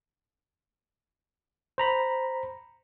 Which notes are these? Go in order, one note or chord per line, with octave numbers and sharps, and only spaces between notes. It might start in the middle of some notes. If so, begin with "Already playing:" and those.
C5 A#5 B5